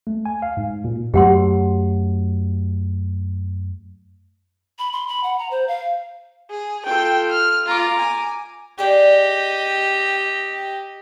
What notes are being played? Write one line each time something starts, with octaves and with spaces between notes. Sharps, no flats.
A3
G#5
F5
G#2
A#2
F#2 F#3 A3 G4 F#5 C6
B5
C6
B5
F#5
A#5
C5
F5
G#4
F4 A4 G5
F6
F4 A#5 D6
G#5
G4 G#4 D5 D#5